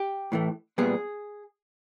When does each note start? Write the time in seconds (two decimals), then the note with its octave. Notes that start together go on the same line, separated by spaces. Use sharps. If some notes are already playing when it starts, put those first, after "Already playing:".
Already playing: G4
0.32 A2 E3 A3
0.78 A#2 G3 B3 G#4